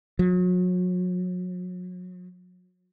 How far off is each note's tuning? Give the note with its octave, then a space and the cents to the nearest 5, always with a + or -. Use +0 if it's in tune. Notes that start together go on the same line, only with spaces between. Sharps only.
F#3 -35